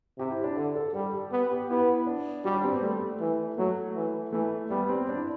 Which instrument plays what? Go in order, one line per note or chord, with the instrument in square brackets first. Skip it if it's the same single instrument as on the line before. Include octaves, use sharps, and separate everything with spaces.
[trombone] C3 [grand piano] G4
[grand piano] E4
D4
[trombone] D3
[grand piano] A4
[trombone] G3 [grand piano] A4
[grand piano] G4
[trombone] B3
[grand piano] G4
[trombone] B3 [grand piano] E4
[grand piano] D4
[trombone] G3 [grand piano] F#4
[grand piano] D4
C4
B3
[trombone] G3 [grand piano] A3
[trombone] E3
[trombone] F#3 [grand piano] A3
[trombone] E3
[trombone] E3 [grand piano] A3
[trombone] G3 [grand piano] B3
[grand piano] C4
D4
E4